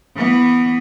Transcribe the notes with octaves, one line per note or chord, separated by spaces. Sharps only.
E3 B3